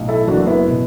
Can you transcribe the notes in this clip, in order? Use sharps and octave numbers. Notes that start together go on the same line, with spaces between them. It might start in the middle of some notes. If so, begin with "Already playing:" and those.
Already playing: B1 A2
E4 A4
F#1 F#2 E3 D4 F#4
B3 E4
B2